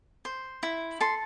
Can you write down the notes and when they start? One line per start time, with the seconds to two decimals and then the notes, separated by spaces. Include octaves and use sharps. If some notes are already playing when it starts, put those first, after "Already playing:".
0.25 C5
0.63 E4
1.01 A4 C6